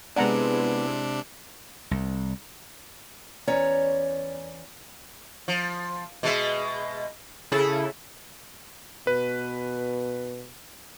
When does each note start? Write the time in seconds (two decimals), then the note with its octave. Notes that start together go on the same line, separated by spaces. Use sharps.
0.16 C3 G#3 B3 D4 E4 D5 F#5 A#5
1.91 C2
3.47 E2 C#4 C#5 D5 A#5
5.48 F3
6.23 B2 G#3 E5
7.52 C#3 E4 G#4 A4
9.07 B2 B4